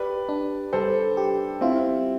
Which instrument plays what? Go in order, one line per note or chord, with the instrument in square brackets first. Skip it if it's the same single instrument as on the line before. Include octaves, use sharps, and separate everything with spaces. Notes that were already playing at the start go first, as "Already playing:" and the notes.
Already playing: [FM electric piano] G4 [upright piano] B4 D5
[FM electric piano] D4
[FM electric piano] G3 [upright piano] A4 C5
[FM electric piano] G4
[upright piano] C4 E4 [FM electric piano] F4